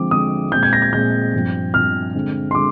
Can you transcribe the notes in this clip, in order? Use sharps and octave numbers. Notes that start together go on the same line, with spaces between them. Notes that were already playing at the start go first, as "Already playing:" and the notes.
Already playing: D3 F3 G#3 C4 D6
D3 F3 G#3 C4 D#6
A#2 G#3 C4 G6
G#6
A#6
G#6
A#2 G#3 C4 G6
G2 F3 C4
G2 F3 C4 F6
D3 G#3 C4
C6
D3 G#3 D6